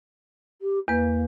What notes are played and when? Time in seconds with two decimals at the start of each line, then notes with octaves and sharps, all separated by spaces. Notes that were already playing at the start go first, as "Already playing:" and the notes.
0.62 G4
0.88 E2 A#3 B4